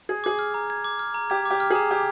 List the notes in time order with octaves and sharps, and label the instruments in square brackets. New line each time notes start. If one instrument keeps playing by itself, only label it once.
[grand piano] G#4 [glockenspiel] G#6
[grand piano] G#4 [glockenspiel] D6
[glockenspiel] F6
A#5
G#6
D6
F6
A#5
[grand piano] G4 [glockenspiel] G#6
[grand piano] G4 [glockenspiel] D6
[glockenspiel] F6
[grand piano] G#4
[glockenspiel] A#5
[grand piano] G4 [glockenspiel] G#6